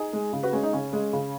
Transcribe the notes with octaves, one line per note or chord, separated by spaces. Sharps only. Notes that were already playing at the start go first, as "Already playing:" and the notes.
Already playing: D#4 G#4
G#3
C#3
F#4 B4
G#3 C#4
D#4
C#3 C#4
G#3
C#3